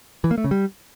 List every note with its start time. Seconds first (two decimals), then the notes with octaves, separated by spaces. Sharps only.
0.24 E3
0.31 A#3
0.38 A3
0.44 C#3
0.51 G3